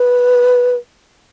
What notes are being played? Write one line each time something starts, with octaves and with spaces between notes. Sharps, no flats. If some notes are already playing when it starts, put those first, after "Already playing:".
Already playing: B4